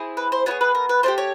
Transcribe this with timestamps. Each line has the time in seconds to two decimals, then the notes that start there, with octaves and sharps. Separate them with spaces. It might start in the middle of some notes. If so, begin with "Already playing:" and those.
Already playing: C4 E4 G#4
0.17 B4
0.32 C5
0.46 B3 E4 C#5
0.51 G#4
0.61 B4
0.75 A#4
0.89 B4
1.03 A3 D4 G4 C5
1.18 C#5